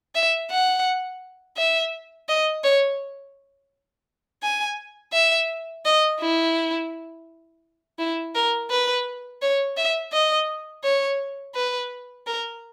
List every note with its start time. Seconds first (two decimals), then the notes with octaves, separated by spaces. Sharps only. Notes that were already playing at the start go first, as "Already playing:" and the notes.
0.15 E5
0.51 F#5
1.57 E5
2.29 D#5
2.64 C#5
4.43 G#5
5.13 E5
5.86 D#5
6.20 E4
7.99 E4
8.35 A#4
8.70 B4
9.42 C#5
9.77 E5
10.13 D#5
10.84 C#5
11.55 B4
12.26 A#4